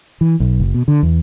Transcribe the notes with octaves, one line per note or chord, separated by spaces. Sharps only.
E3
B1
F#1
B2
D3
E2